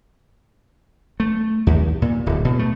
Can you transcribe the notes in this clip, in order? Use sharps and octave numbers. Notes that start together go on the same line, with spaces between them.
A3
D#2
A#2
D1
B2
A3